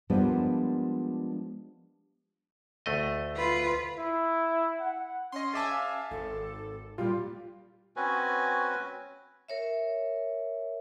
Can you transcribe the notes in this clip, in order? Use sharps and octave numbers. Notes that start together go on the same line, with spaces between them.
F3 G3 G#3 A#3 B3 D4
D2 A3 D#5
F4 B4
E4
F#5
C#4 D#5 C6
G#4 E5 G#5 A5 D6 A6
F5
G#1 A4
A#2 G3 F4 G4
C4 C#4 F#4 B4 G#5
A#4 C#5 E5